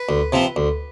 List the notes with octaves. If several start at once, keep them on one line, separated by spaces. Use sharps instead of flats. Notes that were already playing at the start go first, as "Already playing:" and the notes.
Already playing: B4
D2
C3 F3 C4
D2